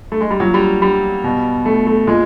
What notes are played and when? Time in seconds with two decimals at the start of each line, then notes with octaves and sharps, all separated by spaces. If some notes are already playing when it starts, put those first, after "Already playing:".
0.12 A3
0.21 G#3
0.31 G3
0.40 A#2 F#3
0.54 G3
0.82 G3
1.24 B2
1.65 A3
1.87 A3
2.07 A#2 G#3